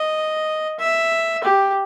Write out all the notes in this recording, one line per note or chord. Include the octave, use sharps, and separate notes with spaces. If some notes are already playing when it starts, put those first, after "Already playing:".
Already playing: D#5
E5
G4